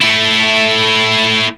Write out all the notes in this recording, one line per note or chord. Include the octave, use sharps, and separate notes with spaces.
A3 E4